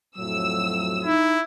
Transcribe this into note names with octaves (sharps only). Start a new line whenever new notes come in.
F2 A2 F#3 E6
D#4 E4